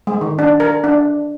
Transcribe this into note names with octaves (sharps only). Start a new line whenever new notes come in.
G#3
D#3
D4
A#4
D4